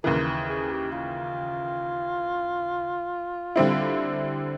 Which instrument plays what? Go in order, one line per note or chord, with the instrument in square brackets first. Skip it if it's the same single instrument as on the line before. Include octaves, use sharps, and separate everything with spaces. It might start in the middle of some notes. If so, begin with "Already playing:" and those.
[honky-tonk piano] D#2 C#3 E3 [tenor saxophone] A#4
[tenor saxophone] G#4
G4
F4
[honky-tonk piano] D3 G3 C4 E4